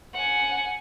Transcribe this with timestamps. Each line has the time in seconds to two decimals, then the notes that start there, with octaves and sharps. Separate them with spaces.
0.14 F#5 G#5